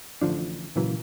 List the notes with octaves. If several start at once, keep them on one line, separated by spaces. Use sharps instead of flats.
A1 D3 F3 D4
A#2 C#3 E3 F#3